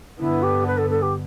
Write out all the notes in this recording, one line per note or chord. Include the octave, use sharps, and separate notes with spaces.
G2 D3 B3 E4
G4
B4
A4
A4
G4